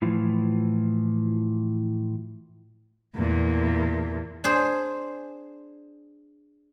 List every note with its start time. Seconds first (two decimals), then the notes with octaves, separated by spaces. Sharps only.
0.02 A2 E3 F3
3.16 E2 A#2
4.44 D4 G#4 C5